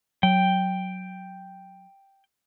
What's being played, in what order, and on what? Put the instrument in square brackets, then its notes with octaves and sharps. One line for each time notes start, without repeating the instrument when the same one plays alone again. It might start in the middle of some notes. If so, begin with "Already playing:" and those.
[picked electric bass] F#3 [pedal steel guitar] G5